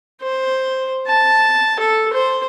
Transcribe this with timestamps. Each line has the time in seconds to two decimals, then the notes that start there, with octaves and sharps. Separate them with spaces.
0.22 C5
1.08 A5
1.79 A4
2.13 C5